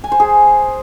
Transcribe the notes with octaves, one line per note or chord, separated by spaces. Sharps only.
G#5
C5
G#4